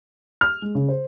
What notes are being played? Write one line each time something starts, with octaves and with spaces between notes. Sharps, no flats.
F6
G#3
C#3
C5